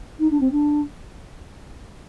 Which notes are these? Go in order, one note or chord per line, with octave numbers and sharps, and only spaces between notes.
D#4
D4
C4
D4